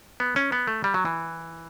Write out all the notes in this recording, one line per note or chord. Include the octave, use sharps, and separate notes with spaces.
B3
C#4
B3
A3
G3
F#3
E3